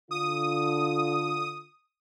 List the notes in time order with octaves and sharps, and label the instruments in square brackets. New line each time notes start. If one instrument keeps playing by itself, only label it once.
[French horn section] D3 F4 [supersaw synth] D#6